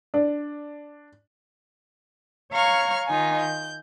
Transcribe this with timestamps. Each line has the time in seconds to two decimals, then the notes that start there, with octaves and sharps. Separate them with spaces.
0.14 D4
2.53 C#5 F5 A#5 C#6 F6 G#6
3.07 D#3 D#4 F4 G#5
3.40 G6